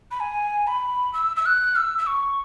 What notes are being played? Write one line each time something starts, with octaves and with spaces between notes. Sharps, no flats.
B5
G#5
B5
E6
E6
F#6
E6
E6
C#6